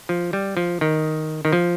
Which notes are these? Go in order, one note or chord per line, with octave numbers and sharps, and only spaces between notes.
F3
G3
F3
D#3
D#3
F3